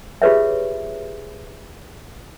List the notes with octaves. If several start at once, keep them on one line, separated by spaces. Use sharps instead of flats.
F4 G4 G#4 B4 C#5 E5